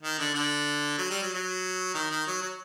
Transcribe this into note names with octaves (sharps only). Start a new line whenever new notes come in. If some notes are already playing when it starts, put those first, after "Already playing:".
D#3
D3
D3
F#3
G3
F#3
F#3
D#3
D#3
F#3
F#3